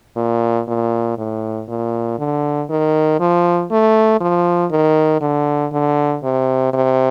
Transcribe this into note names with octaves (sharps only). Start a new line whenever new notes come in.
A#2
A#2
A2
A#2
D3
D#3
F3
A3
F3
D#3
D3
D3
C3
C3